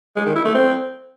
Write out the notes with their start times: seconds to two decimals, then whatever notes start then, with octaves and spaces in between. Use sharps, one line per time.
0.16 G#3
0.26 D#3
0.35 E4
0.45 A3
0.55 C4